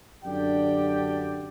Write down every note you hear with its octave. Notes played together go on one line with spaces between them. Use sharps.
F#2 D3 D4 G4 D5 G5